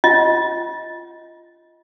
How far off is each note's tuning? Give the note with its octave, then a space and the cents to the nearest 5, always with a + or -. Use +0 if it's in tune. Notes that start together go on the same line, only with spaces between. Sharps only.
F4 -20 D#5 +15